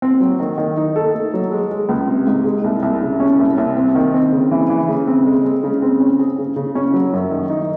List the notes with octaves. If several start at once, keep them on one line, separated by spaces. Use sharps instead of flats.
C4
F#3
D#3
D#3
D#4
A4
A3
F#3
G#3
G#3
C#2
C3
G#2
G#3
C2
C2
C#3
C#4
C2
C2
C4
D#3
C4
C#3
E3
E3
C#3
C4
G#3
G#3
C#3
C4
C#4
G#4
C#3
C#3
C#4
F#3
F#2
D#3
D#4